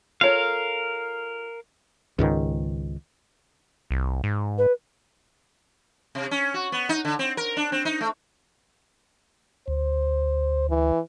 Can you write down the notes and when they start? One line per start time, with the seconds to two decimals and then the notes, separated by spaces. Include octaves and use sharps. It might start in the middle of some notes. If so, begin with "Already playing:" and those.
0.21 F4 A4 A#4 C#5 F5
2.19 C#2 G#2 D#3
3.91 C2
4.24 G#2
4.58 B4
6.15 C3
6.31 C#4
6.54 F#4
6.72 B3
6.89 D#4
7.05 D3
7.19 C4
7.37 A#4
7.57 D4
7.72 C4
7.85 D#4
8.01 A3
9.68 D2 C5
10.69 E3